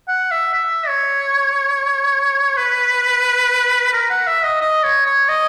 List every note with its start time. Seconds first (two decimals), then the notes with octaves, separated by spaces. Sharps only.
0.08 F#5
0.31 E5
0.53 E5
0.88 C#5
2.57 B4
3.93 A#4
4.10 F#5
4.27 E5
4.44 D#5
4.61 D#5
4.83 C#5
5.06 C#5
5.29 D#5